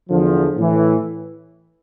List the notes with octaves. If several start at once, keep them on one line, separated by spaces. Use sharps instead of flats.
E2 D3 F3
A2 E3